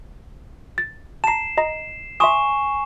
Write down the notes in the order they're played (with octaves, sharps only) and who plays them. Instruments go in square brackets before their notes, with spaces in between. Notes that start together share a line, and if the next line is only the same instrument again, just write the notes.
[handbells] A6
[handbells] A5 A#5 [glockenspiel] C7 E7
[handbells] D#5 A#5
[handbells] E5 C6 D#6 [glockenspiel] G#5 C#6 E7